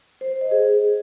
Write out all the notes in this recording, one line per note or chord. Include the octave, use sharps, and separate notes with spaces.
C5
C5
D#5
G#4